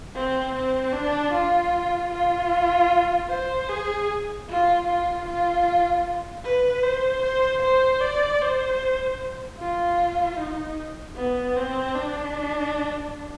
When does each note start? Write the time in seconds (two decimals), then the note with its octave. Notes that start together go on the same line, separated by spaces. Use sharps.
0.15 C4
0.55 C4
0.93 D4
1.32 F4
2.11 F4
3.29 C5
3.69 G#4
4.48 F4
4.87 F4
5.26 F4
6.44 B4
6.83 C5
7.22 C5
7.62 C5
8.01 D5
8.41 C5
9.59 F4
10.37 D#4
11.16 B3
11.56 C4
11.95 D4